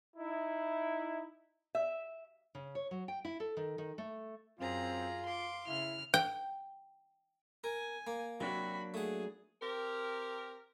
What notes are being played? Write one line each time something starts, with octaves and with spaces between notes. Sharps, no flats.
D#4 E4
E5
C#3
C#5
F#3
G5
E4
A4
D#3
D#3
A3
F#2 C4 F4 G#4 A#5
F5 C6 D6
C#3 E4 F6
G5
A#4 G#5
A#3
C3 F#3 A#3 D4 F#4 B5
A3 G#4 F#5
C4 G4 A#4